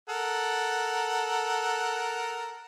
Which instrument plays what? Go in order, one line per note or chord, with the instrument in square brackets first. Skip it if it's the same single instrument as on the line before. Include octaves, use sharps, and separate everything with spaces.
[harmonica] A4 A#4 F#5